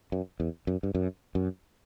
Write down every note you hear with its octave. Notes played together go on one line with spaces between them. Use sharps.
F#2
E2
F#2
G2
F#2
F#2